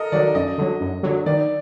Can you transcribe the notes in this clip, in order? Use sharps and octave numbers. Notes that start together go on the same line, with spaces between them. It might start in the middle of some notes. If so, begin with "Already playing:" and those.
Already playing: A4 A#4 D#5
D#3 F#3 D5
F#2 D#5
D3 F#3
F#2
D3 F#3
D#3 D5